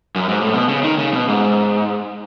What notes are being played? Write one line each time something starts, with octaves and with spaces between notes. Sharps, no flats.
F#2
G#2
A2
B2
C#3
D#3
C#3
B2
G#2